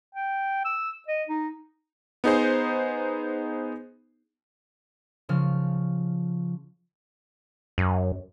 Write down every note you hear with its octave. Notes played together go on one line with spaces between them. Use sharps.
G5
E6
D#5
D#4
B3 D#4 G#4 C5
C#3 F3 C#4 F6
F#2